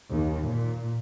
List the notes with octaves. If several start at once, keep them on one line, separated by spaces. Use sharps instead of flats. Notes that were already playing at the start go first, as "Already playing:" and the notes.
D#2
A#2